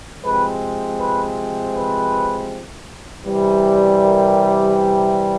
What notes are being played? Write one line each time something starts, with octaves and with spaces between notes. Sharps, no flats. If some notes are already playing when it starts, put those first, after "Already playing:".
C3 F3 G#3 C4 B4
B4
B4
C3 E3 G3
A#4